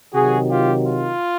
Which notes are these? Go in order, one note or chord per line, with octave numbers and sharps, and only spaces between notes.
C3 D#3 F#3 F#4 G#4
F4 G4
F4